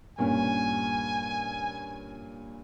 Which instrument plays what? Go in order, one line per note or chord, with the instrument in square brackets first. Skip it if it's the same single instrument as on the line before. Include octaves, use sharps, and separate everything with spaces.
[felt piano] G2 A#2 C#4 [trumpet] G#5